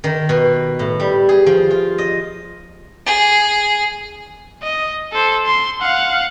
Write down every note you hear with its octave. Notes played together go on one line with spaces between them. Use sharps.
D#3
B2
A2
G3
G#4
F3
F4
D#5
G#4
D#5
A4 C5
C6
F5 F#5